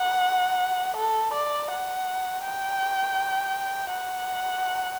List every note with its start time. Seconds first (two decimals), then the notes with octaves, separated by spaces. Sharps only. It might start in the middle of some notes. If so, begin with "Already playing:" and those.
Already playing: F#5
0.97 A4
1.34 D5
1.71 F#5
2.44 G5
3.91 F#5